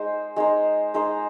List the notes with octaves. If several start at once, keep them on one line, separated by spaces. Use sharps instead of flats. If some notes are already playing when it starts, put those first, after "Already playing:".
Already playing: G#3 D#4 C5
G#3 D#4 C5
G#3 D#4 C5